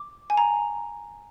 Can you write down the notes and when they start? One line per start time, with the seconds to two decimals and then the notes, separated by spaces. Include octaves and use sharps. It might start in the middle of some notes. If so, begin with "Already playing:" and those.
Already playing: D6
0.30 G#5
0.37 A#5